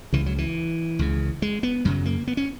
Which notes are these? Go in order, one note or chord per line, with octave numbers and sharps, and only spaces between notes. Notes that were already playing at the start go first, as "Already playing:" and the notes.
C#2 C#3 E3
F#3
E3
C#2 C#3
G#3
B3
F#2 C#3 F#3
A#3
B3
C#4